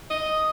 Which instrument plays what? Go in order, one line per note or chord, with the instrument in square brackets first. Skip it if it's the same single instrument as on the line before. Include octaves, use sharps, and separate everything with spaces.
[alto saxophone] D#5